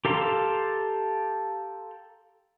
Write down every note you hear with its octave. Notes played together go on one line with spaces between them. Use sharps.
G4 A4 F5 A#5 C6